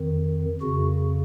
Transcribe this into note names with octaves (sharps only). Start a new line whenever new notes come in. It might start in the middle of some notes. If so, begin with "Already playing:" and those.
Already playing: F2 D#3
F2 C#3 F#4